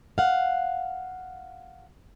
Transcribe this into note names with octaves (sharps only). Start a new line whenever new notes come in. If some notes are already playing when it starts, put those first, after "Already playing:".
F5 F#5